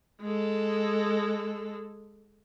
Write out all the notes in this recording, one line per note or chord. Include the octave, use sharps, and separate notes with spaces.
G#3 A4